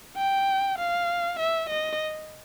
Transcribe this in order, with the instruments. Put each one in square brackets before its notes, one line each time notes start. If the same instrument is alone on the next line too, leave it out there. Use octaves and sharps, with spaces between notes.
[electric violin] G5
F5
E5
D#5